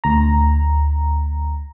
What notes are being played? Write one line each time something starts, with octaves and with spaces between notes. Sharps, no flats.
D2 A#5